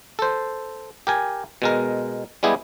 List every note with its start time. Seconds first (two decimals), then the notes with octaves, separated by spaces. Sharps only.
0.19 A4 C5
1.07 G4 A#4 G#5
1.62 B2 G#3 A#4
2.43 G3 G#3 B3 E4 G4 G#4